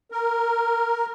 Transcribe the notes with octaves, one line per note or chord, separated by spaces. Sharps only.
A#4